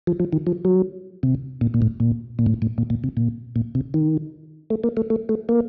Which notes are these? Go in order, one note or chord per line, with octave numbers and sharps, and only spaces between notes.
F3
F3
D#3
F3
F#3
C3
A#2
A#2
A2
A#2
A#2
A2
A2
A#2
A#2
C3
A#2
A#2
C3
D#3
A3
A#3
A3
A3
A3
A#3